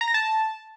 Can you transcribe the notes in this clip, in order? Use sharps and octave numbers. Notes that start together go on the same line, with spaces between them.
A#5
A#6
A5